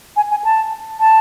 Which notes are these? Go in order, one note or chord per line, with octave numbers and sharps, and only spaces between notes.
G#5
G#5
A5
A5